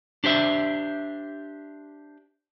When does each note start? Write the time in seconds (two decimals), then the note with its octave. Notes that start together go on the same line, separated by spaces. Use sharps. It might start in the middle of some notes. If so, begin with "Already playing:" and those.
0.24 D4 G4 C5 E5